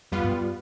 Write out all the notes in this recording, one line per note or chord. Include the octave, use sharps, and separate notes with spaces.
F2 G3 B3 F4 B4
G2